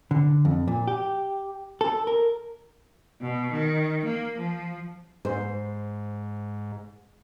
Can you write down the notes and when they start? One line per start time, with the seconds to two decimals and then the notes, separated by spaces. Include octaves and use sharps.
0.11 D3
0.45 F2
0.68 A#2
0.88 G4
1.81 A4
2.07 A#4
3.21 B2
3.52 D#3
4.06 A#3
4.38 F3
5.25 G#2 C5